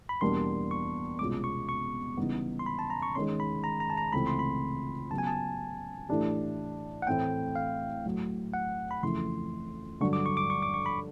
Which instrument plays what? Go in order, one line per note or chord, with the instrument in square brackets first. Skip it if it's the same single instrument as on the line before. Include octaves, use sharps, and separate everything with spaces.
[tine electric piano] B5
[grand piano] E2 B2 G3 A#3 D4 [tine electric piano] C6
[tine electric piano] C#6
[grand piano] C2 B2 G#3 C#4 F4 [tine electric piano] D6
[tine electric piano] C#6
C#6
[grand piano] C#3 E3 G3 B3 D#4
[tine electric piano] C6
B5
A5
A#5
C#6
[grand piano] D#3 G#3 C#4 [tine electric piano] C6
[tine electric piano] B5
A#5
A#5
A5
A#5
[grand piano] C#2 C3 E3 A3 C4 [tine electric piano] B5
[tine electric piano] C6
B5
[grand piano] C#3 F#3 B3 [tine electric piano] A5
[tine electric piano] G#5
A5
[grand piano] A2 E3 A3 D4 G4
[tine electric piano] F#5
[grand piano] A2 E3 A3 C4 E4 [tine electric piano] G5
[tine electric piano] F5
[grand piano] A2 F#3 A3
[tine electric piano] F#5
B5
[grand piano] F2 C#3 E3 A3 [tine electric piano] C6
[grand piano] G2 D3 F#3 [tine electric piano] C#6
[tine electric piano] D6
C#6
D6
C#6
D6
C#6
B5